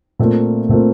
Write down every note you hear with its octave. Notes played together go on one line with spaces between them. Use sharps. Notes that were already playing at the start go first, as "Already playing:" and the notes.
A#2 A3 C4 F4 A#4
A#2 A3 C4 F4 A#4